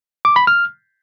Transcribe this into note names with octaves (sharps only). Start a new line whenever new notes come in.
D6
B5
F6